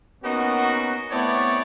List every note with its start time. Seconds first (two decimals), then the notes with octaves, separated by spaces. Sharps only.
0.24 A#3 B3 C#4 D#4 F#4
1.11 A3 B3 C4 E4 C#5 D5